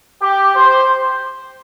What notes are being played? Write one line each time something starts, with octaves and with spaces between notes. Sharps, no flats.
G4
C5